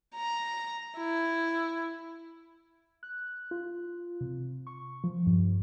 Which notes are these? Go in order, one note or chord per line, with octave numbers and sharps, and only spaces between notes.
A#5
E4
F#6
F4
C3
C#6
F3
G2